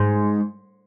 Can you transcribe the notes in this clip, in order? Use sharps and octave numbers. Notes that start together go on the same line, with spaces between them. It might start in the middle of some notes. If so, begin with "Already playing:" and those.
Already playing: G#2